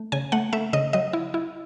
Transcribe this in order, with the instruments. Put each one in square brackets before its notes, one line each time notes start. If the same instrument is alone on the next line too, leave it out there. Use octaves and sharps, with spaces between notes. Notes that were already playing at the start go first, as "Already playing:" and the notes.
Already playing: [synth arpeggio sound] A3
C#3 G#5
A3 F#5
A3 E5
C#3 D#5
F#3 D#5
E4
E4